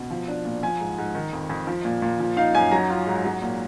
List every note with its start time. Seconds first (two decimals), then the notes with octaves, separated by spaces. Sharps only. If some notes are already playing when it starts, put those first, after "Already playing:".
Already playing: B2
0.10 F3
0.28 D4
0.45 A#2
0.63 F3 G#5
0.80 G#2
0.98 G#2
1.15 D#3
1.33 F2
1.49 F2
1.67 F3
1.85 A#2
2.02 A#2
2.20 F3
2.37 D#4 F5
2.55 F#2 G#5
2.72 F#3 A#5
2.90 F4
3.06 G#2
3.25 F#3
3.42 A#2